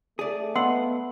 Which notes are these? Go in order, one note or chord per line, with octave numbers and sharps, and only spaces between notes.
A3 G#4 D5
B3 D#5 F5 F#5 B5 C6 E6